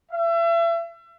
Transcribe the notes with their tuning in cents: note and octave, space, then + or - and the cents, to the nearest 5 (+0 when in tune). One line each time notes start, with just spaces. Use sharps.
E5 +35